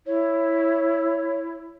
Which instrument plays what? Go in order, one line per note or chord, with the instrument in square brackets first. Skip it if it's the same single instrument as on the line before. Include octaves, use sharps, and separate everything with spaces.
[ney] E4 [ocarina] C#5